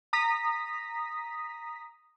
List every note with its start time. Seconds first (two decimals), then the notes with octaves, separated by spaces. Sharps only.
0.13 A#5 D#6 A#6 B6